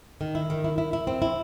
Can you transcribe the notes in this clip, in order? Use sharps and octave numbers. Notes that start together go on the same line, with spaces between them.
D#3
E4
D#3
E4
E4
E4
C4
E4